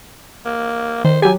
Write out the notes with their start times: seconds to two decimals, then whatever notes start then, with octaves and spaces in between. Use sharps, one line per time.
0.46 A#3
1.05 D#3 C5
1.22 F#3 G4 G#5